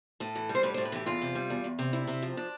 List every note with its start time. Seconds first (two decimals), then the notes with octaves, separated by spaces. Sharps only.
0.20 A2 A4
0.35 E3
0.49 G3
0.55 C5
0.63 A2 B4
0.74 C5
0.78 A2
0.85 B4
0.92 E3 G4
1.06 E2 F4
1.22 C3
1.35 G3
1.50 E2
1.64 E2
1.79 C3
1.93 D2 E4
2.07 C3
2.22 F3
2.37 D4